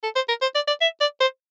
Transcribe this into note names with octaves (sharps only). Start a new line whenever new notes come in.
A4
C5
A#4
C5
D5
D5
E5
D5
C5